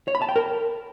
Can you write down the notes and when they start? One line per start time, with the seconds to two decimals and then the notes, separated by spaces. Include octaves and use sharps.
0.08 C#5
0.15 B5
0.22 A5
0.29 G5
0.36 A#4